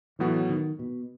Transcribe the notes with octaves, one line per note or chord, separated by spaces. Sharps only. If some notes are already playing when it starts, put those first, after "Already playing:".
A2 E3 F#3 B3 F#4
D#3
B2